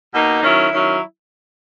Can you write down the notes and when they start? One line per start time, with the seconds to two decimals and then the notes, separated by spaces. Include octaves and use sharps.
0.14 B2 A#3 D#4
0.43 D#3 F#3 C#4 E4
0.72 D#3 F#3 C#4 E4